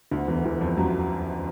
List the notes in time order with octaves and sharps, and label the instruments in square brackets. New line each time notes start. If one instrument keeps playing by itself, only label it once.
[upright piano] D2 D3
E2 E3
E2 E3
F2 F3
F#2 F#3